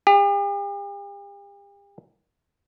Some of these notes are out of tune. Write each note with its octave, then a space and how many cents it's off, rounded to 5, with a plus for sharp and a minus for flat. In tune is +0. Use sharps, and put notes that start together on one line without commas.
G4 +45